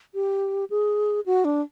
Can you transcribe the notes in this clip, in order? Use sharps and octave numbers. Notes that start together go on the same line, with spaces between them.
G4
G#4
F#4
D4